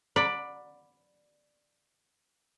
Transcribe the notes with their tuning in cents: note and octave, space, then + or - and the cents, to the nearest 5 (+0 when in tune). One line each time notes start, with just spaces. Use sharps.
D5 +10 F#5 -20 B5 +0